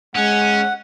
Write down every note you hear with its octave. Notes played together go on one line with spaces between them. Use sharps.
G#3 C#4 F#5